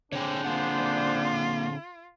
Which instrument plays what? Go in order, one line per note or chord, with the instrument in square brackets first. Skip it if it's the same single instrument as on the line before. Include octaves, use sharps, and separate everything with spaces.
[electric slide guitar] D3 C4 G#4 [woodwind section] D4 C5 [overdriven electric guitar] C#5 G5
[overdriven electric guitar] A#3 F#5 [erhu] F4